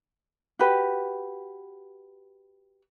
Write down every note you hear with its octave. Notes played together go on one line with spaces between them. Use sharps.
F#4 G4 B4